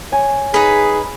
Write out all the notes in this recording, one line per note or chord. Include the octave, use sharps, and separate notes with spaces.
C#5 G#5
D#4 G#4 B4